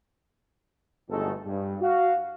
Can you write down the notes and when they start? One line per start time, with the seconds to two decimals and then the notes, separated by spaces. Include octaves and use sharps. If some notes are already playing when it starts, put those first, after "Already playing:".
1.09 G1 B2 D#3 G#3 A3 A4
1.45 G2
1.81 F#4 F5